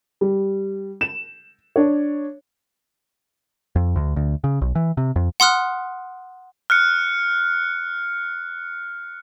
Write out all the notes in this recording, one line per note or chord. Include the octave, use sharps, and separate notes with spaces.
G3
E7
D4 C#5
F2
D2
D2
C#3
B1
E3
C3
F2
F#5 C6 D#6 F6 F#6
F6 F#6 C#7